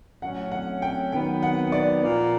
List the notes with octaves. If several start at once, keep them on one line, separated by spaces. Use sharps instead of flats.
A2 F#3 A3 C#4 F#5
F#5
G5
D#3 F#3 B3 G5
F#5
D5
A#2 F3 A#3